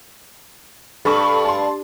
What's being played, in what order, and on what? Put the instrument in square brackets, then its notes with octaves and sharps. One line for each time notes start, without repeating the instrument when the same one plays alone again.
[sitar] G2 [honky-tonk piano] A4 B5 C#6
[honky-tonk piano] A5 C6